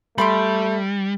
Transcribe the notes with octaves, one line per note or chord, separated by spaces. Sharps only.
G3 A3 B5 C6 D6